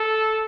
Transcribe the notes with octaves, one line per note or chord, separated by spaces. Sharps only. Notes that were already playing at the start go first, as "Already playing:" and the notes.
Already playing: A4